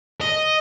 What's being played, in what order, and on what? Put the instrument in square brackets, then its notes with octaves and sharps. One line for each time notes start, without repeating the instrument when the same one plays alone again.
[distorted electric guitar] D#5